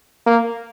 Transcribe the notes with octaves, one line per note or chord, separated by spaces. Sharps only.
A#3